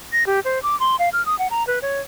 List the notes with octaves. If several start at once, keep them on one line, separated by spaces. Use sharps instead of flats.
A#6
G4
C5
D6
C6
F5
F6
D#6
F#5
A#5
B4
C#5